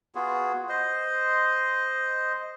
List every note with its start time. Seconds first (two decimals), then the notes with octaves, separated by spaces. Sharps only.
0.15 B3 F4 F#4 G#4
0.69 C5 D#5